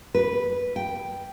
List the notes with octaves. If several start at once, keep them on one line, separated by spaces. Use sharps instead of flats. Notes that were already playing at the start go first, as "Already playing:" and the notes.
B4
G5